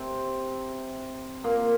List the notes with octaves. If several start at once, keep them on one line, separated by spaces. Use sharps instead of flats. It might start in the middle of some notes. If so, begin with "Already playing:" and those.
Already playing: C3 C4
A#2 A#3